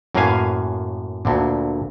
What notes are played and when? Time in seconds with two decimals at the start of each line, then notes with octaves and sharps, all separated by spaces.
0.15 F#2 A2 A#3 B4 F5 G#5
1.25 D2 A#2 D3